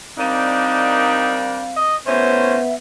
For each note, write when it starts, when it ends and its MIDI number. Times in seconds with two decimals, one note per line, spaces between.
0.18 1.65 55
0.18 1.96 60
0.18 1.65 62
0.18 1.51 63
0.18 1.65 70
0.18 1.75 77
1.77 1.96 75
2.06 2.61 45
2.06 2.61 48
2.06 2.76 59
2.06 2.61 61
2.06 2.62 72
2.06 2.75 76